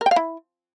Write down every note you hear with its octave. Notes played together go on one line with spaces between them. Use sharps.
A#4
G5
F5
E4